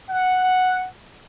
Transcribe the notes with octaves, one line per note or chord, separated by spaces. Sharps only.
F#5